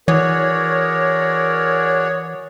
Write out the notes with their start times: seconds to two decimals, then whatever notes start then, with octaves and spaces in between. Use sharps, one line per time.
0.08 E3 F#4 G#4 A#4 C#5 D5